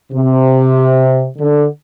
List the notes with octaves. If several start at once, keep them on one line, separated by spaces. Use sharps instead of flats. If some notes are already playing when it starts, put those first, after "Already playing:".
C3
D3